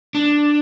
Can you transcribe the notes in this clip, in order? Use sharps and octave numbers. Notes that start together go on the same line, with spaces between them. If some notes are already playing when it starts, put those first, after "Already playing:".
D4